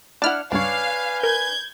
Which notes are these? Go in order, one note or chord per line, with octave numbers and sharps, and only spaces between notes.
D4 E4 F#5 A5 F6
C#2 G2 D4 B4 C#5 F5 G#5
A#4 G6 G#6